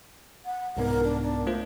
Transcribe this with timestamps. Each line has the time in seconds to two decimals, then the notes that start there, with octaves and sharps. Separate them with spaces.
0.46 F#5
0.77 C2 G#2 B3 A#4
1.04 D4
1.22 D4
1.47 A3 F4 C5